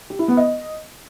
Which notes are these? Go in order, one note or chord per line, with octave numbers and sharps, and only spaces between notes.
G4
E4
B3
D#5